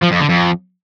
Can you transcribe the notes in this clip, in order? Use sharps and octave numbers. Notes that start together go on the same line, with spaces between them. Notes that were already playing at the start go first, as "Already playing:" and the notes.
F3
F2
D3
F2